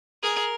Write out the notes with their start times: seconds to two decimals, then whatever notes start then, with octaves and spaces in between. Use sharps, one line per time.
0.23 G#4 A#4